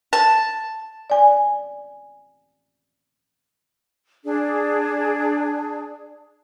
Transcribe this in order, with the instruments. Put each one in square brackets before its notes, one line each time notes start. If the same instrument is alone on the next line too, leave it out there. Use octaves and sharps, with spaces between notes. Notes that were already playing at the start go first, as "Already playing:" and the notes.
[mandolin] A5
[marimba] D5 G#5
[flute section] D4 G#4